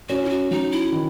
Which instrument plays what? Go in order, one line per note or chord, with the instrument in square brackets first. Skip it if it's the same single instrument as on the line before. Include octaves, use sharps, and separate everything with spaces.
[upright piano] C#4 [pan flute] F#4
[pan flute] E4
F#4
[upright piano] F#3 [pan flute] D#4
[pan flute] E4
[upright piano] D#3